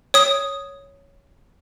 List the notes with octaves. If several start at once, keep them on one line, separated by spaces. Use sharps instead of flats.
C#5 D#6